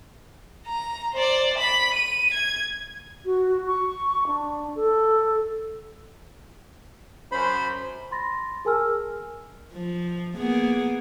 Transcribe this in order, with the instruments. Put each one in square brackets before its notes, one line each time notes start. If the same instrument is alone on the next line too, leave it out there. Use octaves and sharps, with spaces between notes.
[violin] A#5
C5 D5
B5
D#7
G#6
[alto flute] F#4
C#6
D4
A4
[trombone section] F#2 C5 [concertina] B5
[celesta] B5 C6 A6 A#6
G#4 A#4 G#5 A5 E6 F6
[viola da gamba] F3
A#3 B3 G#4